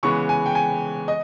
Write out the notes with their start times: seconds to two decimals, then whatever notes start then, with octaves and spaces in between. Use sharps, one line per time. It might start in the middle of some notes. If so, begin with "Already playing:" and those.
0.03 C#3 E3 G#3 B3 C#6
0.29 G#5
0.46 G5
0.55 G#5
1.08 D#5